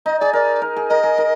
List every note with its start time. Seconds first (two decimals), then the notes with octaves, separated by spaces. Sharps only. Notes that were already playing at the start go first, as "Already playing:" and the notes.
0.06 D#4 D#5
0.19 G#4 D5
0.33 A#4 D5
0.62 A#4
0.76 G#4
0.89 A#4 D#5
1.03 G#4
1.18 A#4